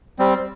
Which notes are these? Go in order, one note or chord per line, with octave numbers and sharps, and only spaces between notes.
G3 C4